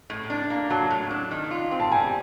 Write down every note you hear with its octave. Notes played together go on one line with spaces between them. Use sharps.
A2
D4
A#3
F#3 A5
A2
D4
D#3
F4
C4
A5
G3 G#5